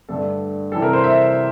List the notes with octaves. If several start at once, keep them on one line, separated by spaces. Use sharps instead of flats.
G2 D3 A3 D4 A4
C3 E3 G3 A4
A#4
C5
E5